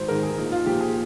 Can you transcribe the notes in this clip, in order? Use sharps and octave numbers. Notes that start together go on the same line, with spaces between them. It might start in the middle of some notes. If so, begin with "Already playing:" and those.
Already playing: G#1 C5
G#2 D#3 A#4
G#4
A#1 D#4
F4
A#2 F3 G4
G#4